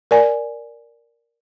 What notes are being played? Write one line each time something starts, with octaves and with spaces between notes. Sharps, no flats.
A#4 D5 G#5